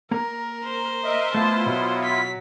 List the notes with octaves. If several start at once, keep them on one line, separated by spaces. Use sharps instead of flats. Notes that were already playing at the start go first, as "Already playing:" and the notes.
A#3 A#4 A#5
C5
A#4 D#5 E5
A3 B3 E4 F4 A5
B2 F#3
B6